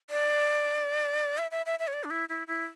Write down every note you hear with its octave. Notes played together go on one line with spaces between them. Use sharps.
D5
E5
E5
E5
E5
C#5
D5
D4
E4
E4
E4